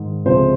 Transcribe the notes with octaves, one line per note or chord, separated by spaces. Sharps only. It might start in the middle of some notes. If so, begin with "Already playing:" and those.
Already playing: G#2 D#3
C#2 C3 F3 G#3 C5